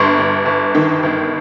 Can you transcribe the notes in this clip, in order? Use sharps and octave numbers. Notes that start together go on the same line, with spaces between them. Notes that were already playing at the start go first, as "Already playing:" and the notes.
Already playing: G1 G2 C6 C#6
G1
G1
D#3
G1